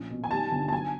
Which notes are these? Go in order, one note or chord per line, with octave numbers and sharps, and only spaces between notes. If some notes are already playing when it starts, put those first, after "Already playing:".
Already playing: A#1 C#4
B2
G#5
G3 A5
G1
A5
F#3 G#5